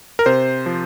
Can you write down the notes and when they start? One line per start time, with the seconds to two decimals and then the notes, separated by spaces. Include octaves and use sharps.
0.19 A#4
0.26 C3 C5
0.66 F3